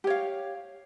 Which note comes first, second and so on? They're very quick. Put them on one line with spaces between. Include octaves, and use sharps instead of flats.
G4 C#5 F5